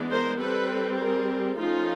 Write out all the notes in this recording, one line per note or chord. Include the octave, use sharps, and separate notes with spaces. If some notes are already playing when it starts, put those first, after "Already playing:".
Already playing: E3 G#3 B3 D4
A#4 C5
G3 C4 A4 B4
G#4 A#4
F3 A3 C#4 D#4 F4